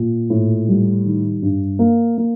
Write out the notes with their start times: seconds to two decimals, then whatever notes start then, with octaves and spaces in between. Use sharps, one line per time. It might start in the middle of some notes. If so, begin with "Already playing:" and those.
Already playing: A#2
0.30 A2
0.68 G3
1.05 D#3
1.42 G2
1.79 A#3
2.17 A#3